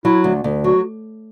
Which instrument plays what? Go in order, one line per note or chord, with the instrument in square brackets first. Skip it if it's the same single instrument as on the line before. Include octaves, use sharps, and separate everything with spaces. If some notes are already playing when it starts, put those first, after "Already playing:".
[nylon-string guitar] F#3 [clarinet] E4
[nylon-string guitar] D2
D2
[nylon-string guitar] F#3 [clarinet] F#4